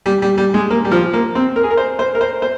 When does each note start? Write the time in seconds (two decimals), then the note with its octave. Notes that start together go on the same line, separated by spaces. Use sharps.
0.06 G3
0.22 G3
0.38 G3
0.54 G#3
0.70 A#3
0.85 G3
0.91 F3
1.14 A#3
1.35 C4
1.56 A#4
1.63 G#4
1.70 A#4
1.77 C5
1.99 C5
2.15 A#4
2.21 C5
2.42 C5